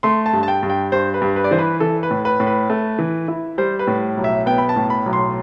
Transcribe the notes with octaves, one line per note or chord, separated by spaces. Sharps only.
A3 C6
A5
G2
A5
G5
G2
G5
G2 C5
B4
G2
B4
D5
E3 C5
B4
E3 A4
B4
A2
B4
A2
B4
A3
E3
E4
G3 C5
B4
A2
B1
E5
B3 G5
B5
A5
A2
B5
B1
C6